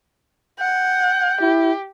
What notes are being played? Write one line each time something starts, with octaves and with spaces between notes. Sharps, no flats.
F#5 G5
E4 G4